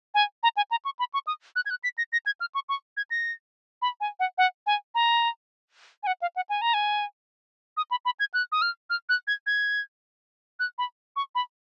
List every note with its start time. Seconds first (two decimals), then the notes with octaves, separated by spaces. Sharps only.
0.14 G#5
0.43 A#5
0.57 G#5
0.71 A#5
0.85 C#6
0.99 B5
1.14 C#6
1.27 D#6
1.56 F#6
1.66 G#6
1.70 F#6
1.84 B6
1.98 A#6
2.12 A#6
2.26 G#6
2.40 F6
2.55 C#6
2.69 C#6
2.97 G#6
3.10 A#6
3.82 B5
4.00 G#5
4.19 F#5
4.38 F#5
4.66 G#5
4.95 A#5
6.03 G#5
6.07 F#5
6.22 F5
6.36 F#5
6.49 G#5
6.61 A#5
6.74 G#5
7.77 D#6
7.91 B5
8.05 B5
8.19 G#6
8.34 F#6
8.52 D#6
8.62 F6
8.90 F6
9.09 F#6
9.27 G#6
9.46 G#6
10.59 F#6
10.78 B5
11.16 C#6
11.35 B5